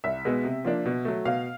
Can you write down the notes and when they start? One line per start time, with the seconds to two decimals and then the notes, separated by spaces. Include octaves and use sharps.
0.04 C2 E5
0.25 B2 G#3 B3
0.45 C3
0.65 F3 A#3 D4
0.86 B2
1.05 F#3 A3
1.25 B2 F5